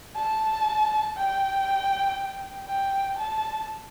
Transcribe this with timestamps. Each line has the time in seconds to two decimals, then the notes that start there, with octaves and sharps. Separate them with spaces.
0.16 A5
1.17 G5
2.68 G5
3.19 A5